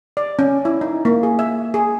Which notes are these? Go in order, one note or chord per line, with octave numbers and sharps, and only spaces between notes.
D5
C#4
E4
D#4
A#3
G#4
E5
G#4